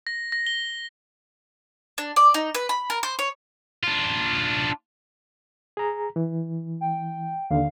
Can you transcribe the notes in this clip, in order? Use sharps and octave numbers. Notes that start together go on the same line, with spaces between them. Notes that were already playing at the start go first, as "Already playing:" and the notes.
A#6
A#6
G7
D4
D5
D#4
B4
B5
A#4
C5
C#5
D4 F4
G#4 A#5
E3
G5
D#2 D3 F5